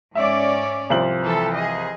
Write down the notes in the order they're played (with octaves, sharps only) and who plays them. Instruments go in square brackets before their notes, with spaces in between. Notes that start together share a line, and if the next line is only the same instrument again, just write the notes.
[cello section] G#2 C#4 D5 [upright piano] E5
[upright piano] C2 F3 F#7
[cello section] E3 A4
G#4 D#5